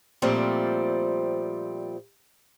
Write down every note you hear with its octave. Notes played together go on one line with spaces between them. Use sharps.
A#2 F3 G3 A3 C4